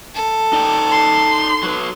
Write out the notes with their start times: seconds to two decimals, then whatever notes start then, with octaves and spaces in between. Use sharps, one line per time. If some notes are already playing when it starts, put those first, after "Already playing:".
0.15 A4
0.53 D#4 D5 G5
0.91 C6
1.63 F#3 B4